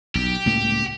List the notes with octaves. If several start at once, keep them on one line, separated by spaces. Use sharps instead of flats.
B1 G4
C#2 A2 A#3